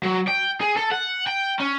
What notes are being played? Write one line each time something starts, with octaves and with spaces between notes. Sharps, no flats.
F#3
G5
G#4
A4
F#5
G5
C#4